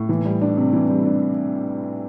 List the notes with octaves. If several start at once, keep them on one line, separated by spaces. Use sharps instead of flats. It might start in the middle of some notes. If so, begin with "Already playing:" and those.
Already playing: A2
E3
G3
D4
C3
E3
G3
D4